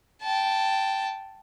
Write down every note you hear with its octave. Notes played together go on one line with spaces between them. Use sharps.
G5 A5